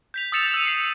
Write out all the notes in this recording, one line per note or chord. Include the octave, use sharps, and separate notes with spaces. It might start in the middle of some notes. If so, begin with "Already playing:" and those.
G6 B6 F7
D#6 E6 A6 C#7 E7 F7
E6 D#7
C7 C#7